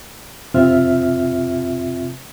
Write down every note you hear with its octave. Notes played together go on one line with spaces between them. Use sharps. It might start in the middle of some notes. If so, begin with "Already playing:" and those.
F2 C3 C4 F4 E5 F6